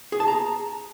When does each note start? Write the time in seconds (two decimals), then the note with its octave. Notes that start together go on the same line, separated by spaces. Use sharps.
0.12 G#4
0.20 A5
0.28 A#5